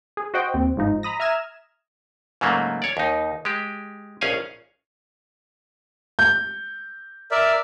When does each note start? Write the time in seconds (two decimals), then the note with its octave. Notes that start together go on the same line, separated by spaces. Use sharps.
0.17 G#4
0.34 F#4 C5 D#5 F#5 G5
0.54 D#2 C4
0.76 G1 G#2 F3 D#4
1.03 A#5 B5 D#6 A#6
1.20 E5 A#5 D#6 F6 G#6 E7
2.41 G#2 C#3 F#3 A3 A#3
2.82 C#5 D5
2.97 D#2 D#4
3.45 G#3 G4
4.21 A#1 C#4 G#4 C#5 F5 G#5
6.19 G6
7.31 A#4 D5 E5